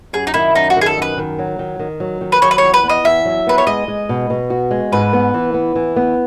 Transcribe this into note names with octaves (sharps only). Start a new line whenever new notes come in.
F#2 G#4
D#4
D#3 E4
F#2 D#4
F#4
D#3
G#4
A4
F#2 B4
D#3
F#3
D#3
D#3
F#3
D#3
B4
F#3 C#5
B4
E2 C#5
B4
B3
D#5
E2 E5
F#3
B3 B4
C#5
G#3 D#5
G#3
B2
B2
F#4
G#3
G#2 B4
B3
E3
B3
E3
B3